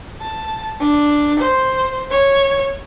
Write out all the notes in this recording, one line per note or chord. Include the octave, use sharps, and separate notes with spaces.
A5
D4
C5
C#5